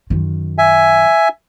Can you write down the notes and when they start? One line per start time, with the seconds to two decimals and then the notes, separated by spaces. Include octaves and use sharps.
0.10 F#2 D#3
0.58 E5 G#5